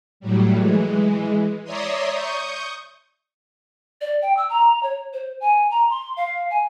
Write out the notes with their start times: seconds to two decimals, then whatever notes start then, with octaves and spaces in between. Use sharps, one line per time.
0.20 A2 F#3 G3
0.54 E3 G#3
1.64 C#5 D5 E5 A#5 C6 D#6
2.12 C#6 D#6 G6
4.01 D5
4.22 G5
4.37 E6
4.50 A#5
4.83 C#5
5.13 C5
5.40 G#5
5.71 A#5
5.90 C6
6.17 F5
6.51 G#5